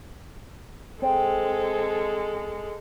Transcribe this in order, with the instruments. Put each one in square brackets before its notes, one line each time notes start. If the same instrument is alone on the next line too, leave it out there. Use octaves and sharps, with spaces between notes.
[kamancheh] G#3 A4 [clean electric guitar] C4